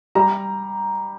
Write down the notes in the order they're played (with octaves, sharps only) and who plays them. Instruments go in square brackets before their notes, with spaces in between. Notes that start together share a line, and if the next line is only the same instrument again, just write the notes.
[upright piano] G3 A#5